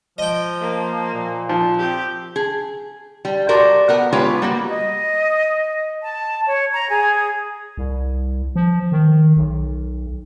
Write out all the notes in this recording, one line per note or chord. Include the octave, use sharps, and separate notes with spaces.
F3 D#5 G5
A#3
A#2
F3
C4 G4
G#4
G3
F#4 G4 A#4 C5 D5
B3 A#4 F#5
G#3 B3 F4 G4 B4 C#5
G3 A#3 F#4
D#5
A5
C#5
A#5
G#4
C2
F3
D#3
B1